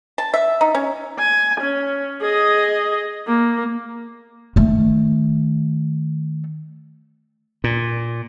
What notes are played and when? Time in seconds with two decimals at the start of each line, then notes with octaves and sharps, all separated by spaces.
0.18 A5
0.34 E5
0.61 D#4
0.75 C#4
1.19 G#5
1.60 C#4
2.22 G#4 D#5
3.27 A#3
4.56 D#3 A3
7.64 A#2